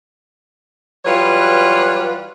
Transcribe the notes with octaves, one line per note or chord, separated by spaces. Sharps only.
E3 F#3 G3 F4 B4 C#5